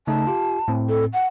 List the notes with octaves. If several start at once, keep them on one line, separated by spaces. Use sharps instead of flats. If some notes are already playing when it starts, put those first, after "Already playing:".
C#3 A3 D#4 A5
F4 G4
A2 C4
A4
F#5